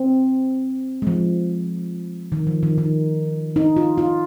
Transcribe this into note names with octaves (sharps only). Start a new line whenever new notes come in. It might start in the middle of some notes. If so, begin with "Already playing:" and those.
Already playing: C4
G#3
F3
D#3
F3
D#3
D#3
D#4
F4
F4